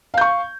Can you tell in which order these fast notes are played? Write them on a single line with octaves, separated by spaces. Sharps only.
F5 G6 C#6